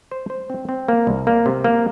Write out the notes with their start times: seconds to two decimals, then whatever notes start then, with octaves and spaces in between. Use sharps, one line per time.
0.11 C5
0.30 C5
0.50 C4
0.69 C4
0.88 A#3
1.07 C2
1.27 A#3
1.46 C3
1.64 A#3